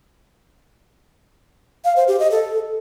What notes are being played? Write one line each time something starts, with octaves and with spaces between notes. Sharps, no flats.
F5
C5
G4
D#5
A4